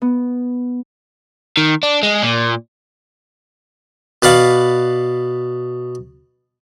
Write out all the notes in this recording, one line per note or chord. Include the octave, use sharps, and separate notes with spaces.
B3
D#3
D4
G#3
A#2
B2 B4 D5 F5 F#5